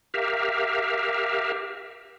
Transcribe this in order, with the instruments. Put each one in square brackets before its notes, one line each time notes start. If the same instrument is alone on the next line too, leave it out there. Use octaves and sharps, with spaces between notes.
[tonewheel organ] G4 A#4 E5 F5